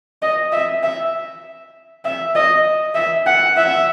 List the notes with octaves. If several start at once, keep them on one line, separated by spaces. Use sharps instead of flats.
D#5
E5
E5
E5
D#5
E5
F#5
E5